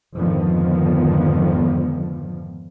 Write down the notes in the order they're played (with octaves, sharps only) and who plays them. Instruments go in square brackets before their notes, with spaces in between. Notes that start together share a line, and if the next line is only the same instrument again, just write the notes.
[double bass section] F2 G#2 D3 D#3 F3 B3